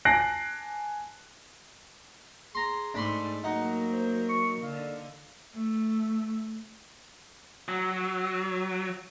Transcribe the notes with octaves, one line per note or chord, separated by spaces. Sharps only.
G#5 A5 F#6 A#6 C7 D7
G#4 A#5 C6
G#2 A3 D4 B5 C6
F#3 A#3 D#4 A#4 F#5
C5
C#6
D3 F5
A3
F#3